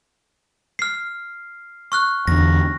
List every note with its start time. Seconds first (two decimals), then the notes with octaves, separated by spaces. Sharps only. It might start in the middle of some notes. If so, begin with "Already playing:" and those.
0.79 F6 C7
1.92 C#6 F6 F#6
2.27 E2 D3 A#6